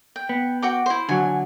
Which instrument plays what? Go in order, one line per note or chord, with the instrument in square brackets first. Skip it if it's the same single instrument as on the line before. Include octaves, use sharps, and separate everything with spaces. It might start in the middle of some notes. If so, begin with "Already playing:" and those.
[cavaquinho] G5
[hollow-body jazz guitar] B3
[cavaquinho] F#4 G5 D6
E4 C5
[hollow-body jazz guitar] D3 F#3 [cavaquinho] G#5